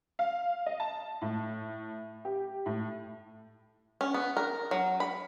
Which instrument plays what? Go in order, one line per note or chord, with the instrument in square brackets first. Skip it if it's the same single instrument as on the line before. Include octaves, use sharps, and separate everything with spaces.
[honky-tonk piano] F5
D#5
A5
A2
G4
A2
[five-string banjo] C#4
B3
A#4
F#3
B5